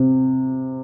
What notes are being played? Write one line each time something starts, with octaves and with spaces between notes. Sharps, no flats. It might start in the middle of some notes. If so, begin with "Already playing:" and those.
Already playing: C3